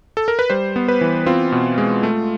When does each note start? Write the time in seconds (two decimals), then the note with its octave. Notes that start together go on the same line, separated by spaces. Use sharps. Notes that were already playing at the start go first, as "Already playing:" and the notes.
0.17 A4
0.28 A#4
0.39 B4
0.50 G3 C5
0.76 B3
0.88 B4
1.01 E3
1.26 C4 F4
1.52 B2
1.78 G#3
2.03 A3